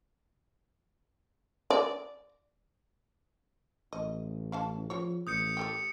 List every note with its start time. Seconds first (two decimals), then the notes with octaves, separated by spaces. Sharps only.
1.70 D5
3.93 A1 D#5
4.52 C#4 F5 A5
4.90 C#3 F3 C#5
5.27 A1 D#6 G6 C#7
5.57 G4 A4 G5